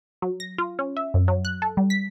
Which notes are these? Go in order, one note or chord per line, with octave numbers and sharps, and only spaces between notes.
F#3
A#6
F4
C#4
E5
F#2
F#3
F#6
A4
G3
B6